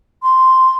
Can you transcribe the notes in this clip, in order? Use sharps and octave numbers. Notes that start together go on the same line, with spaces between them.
C6